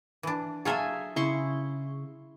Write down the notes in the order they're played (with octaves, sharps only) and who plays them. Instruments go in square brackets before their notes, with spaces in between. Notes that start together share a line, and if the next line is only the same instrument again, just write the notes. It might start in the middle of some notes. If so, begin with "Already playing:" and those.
[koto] E3 D4
[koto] F#3 F4 A4 [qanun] G#4 E5 G#5
[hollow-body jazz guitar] C#3 [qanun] E4 C6 C#6